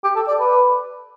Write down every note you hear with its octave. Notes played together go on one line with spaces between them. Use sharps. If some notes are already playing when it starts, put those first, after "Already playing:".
G4
A4
D5
B4